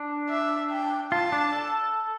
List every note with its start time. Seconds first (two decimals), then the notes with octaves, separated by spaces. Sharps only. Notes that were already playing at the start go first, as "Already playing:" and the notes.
Already playing: D4
0.30 E5
0.71 G5
1.12 F4 A5
1.32 D4
1.53 A4